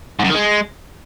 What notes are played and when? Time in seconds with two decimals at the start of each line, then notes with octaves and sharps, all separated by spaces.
0.19 G#2
0.24 F#2
0.29 D#3
0.34 G#3